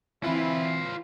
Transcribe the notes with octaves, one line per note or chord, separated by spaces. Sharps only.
E3 C4 E4 F4 B4 G#5